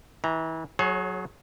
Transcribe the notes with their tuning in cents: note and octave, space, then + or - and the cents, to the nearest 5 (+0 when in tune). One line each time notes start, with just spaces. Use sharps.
E3 -30 A#5 +0
F#3 +0 G#4 +30 C#5 -30